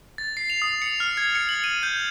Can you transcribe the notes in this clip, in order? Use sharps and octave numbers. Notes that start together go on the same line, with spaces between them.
A6
C7
F7
D#6
C#7
F6
G#6
C#7
F#7
D#7
G6